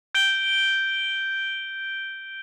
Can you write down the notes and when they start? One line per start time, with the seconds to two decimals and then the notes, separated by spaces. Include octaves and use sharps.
0.15 G6 D7 G7